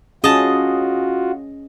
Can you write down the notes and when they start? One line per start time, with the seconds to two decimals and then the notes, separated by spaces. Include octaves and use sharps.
0.24 C#4 F4 F#4 G#4 D#5 A5